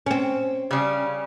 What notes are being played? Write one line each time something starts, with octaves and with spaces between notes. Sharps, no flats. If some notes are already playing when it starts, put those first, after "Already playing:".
C4 C#4
C#3 G3